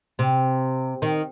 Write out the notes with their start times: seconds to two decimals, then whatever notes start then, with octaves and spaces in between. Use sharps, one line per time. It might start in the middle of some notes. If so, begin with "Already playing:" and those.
0.19 C3
1.02 D#3